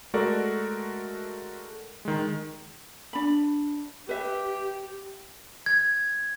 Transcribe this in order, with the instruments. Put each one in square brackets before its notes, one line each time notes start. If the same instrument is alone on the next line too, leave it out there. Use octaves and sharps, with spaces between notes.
[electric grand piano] G#3 A3 F#4 A4 A#4 D5
D#3 G#3
[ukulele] D4 B5
[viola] G4 [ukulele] B4 E5
[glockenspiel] G#6